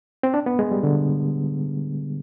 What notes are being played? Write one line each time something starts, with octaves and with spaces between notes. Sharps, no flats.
C4
D4
B3
G#3
G3
D3